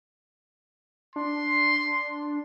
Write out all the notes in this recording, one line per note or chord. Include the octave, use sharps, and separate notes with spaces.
D4 C6